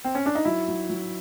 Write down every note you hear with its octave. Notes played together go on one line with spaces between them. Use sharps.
C4
C#4
D4
D#4
F#3 E4
F#3
F#3